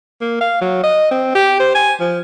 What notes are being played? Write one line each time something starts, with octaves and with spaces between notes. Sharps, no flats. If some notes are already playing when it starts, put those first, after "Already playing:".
A#3
F5
F#3
D#5
C4
G4
C5
G#5
F3